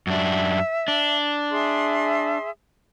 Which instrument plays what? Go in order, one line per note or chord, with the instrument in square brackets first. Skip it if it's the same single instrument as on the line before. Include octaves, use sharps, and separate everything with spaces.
[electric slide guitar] F#2 D4 [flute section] E5
[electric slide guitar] D4
[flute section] G#4 E5 C6